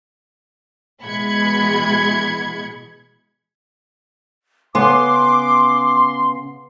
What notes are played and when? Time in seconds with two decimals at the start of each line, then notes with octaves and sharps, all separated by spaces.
1.03 B2 E3 G#3 B5 G#6 C#7
4.75 C#3 B3 C6 D6